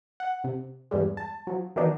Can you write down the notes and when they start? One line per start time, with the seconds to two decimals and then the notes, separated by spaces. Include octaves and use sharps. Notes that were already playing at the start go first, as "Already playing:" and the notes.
0.20 F#5
0.44 C3
0.91 E2 G2 G3 G#3
1.17 A5
1.47 F3 F#3
1.76 D#3 E3 F#3 B3 D4 D#4